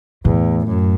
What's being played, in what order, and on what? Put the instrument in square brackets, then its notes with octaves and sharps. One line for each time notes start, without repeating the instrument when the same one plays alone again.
[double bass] E2 [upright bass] A2
[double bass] F#2